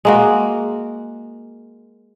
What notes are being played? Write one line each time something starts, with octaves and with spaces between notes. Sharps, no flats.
G#3 A#3 F#4